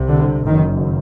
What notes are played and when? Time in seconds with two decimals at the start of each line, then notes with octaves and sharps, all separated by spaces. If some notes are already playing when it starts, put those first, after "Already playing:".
Already playing: C2 C3
0.09 D3
0.47 F#1 F#2 D#3